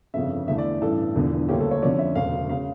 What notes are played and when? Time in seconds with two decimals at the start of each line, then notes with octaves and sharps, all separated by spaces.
0.14 G1 F2 C#3 E5
0.48 E2 D3 A3 E5
0.58 D5
0.81 A1 G2 E3 A4
1.15 E1 E2 D3 F3
1.49 D2 C#3 G3 A#3 C#4 G4
1.60 A4
1.71 C#5
1.82 F2 D3 F3 C#4 D5
1.99 E5
2.15 E1 D2 C#3 F5
2.50 C#3 F5